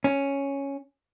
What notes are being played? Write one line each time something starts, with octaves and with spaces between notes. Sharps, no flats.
C#4